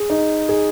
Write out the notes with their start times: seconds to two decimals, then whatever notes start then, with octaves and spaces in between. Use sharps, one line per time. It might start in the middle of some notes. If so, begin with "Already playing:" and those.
Already playing: G#4
0.10 D#4
0.49 G#4